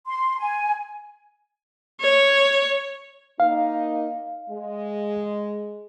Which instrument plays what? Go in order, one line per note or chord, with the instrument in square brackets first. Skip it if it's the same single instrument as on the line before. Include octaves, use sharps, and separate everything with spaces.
[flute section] C6
G#5
[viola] C#5
[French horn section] A#3 D#4 [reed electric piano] F5
[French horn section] G#3